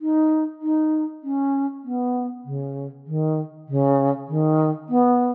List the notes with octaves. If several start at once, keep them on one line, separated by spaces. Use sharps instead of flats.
D#4
D#4
C#4
B3
C#3
D#3
C#3
D#3
B3